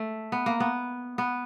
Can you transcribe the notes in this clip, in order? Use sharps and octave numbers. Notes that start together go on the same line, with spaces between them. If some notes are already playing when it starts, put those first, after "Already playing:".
Already playing: A3
B3
A#3
B3
B3